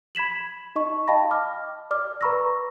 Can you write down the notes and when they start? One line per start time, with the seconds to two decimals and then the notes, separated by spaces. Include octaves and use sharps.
0.15 B5 G#6 B6 E7 F#7
0.76 D#4 D#5 C#6
1.08 D#5 F5 G5 A5 B5 A#6
1.31 D6 F6
1.91 D5 D6 F6
2.21 B4 A#5 B5 C#6 E6 A#6